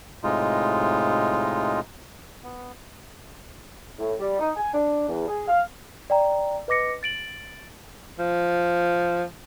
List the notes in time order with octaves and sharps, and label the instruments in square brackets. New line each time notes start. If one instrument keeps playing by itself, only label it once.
[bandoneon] A2 C3 G#3 D#4 F4
B3
[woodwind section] A2
G3
D#4
G#5
D4
E2
G#4
F5
[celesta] D5 G5 A#5
B4 D#5 D6 A#6 C#7
A6 D7 F#7
[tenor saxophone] F3